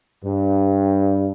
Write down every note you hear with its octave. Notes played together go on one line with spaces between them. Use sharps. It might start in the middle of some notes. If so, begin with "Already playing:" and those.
G2